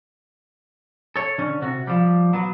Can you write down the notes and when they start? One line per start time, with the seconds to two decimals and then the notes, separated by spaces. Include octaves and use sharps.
1.16 A4 C#5
1.38 D3 C#4
1.62 C3 F#4
1.87 F3 G3
2.33 F#3 B3